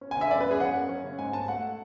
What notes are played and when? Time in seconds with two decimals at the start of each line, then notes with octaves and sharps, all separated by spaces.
0.01 C#4
0.11 G#5
0.17 D2 E5
0.31 F#2 D5
0.40 B4
0.46 F#2
0.51 G#4
0.60 C#4 F#5
0.75 F#2
0.89 C#4
1.04 C#3
1.19 G#2 G#5
1.33 G#2 A5
1.48 A3 F#5